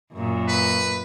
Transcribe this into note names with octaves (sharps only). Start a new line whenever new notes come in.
F#2 A#2
B4